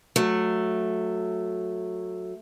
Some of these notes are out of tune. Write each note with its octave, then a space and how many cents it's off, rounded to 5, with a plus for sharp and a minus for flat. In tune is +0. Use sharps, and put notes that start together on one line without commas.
F#3 -15 A3 +0